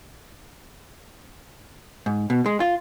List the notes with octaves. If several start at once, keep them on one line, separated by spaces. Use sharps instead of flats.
G#2
B2
G#3
F4